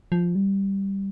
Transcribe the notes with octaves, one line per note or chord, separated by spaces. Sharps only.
F3
G3